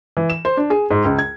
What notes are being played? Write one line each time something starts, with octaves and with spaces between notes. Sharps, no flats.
E3
E7
C5
D4
G#4
G#2
C#2
G#6